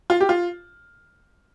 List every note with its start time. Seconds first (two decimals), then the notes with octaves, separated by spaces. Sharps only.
0.10 F4
0.21 G4
0.29 F4